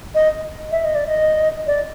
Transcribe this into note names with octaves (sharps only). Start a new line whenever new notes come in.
D#5
E5
D#5
D5
D#5
D5